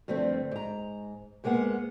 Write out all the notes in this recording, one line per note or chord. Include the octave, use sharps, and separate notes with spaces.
G2 D3 F3 A3 C4
G#2 A#5
G#2 G#3 A#3 B3 F#5